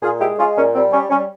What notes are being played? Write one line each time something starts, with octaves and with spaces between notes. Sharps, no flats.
A#2 F4 G#4
G#3 E4 G4
G#3 C#4 F4
A#2 C#4
G3 C4
G3 C#4
G3 C#4